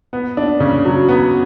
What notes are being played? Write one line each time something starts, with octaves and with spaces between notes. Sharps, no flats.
B3
D4
C#3
F#3
B3